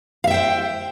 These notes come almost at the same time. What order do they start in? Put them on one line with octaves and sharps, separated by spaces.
F5 E5 G5 C5